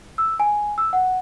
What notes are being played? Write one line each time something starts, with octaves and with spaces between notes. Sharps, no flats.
E6
G#5
E6
F#5